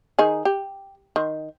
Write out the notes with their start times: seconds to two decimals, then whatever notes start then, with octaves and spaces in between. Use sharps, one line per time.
0.19 D#3 D#4 G#4
0.45 G4
1.16 D#3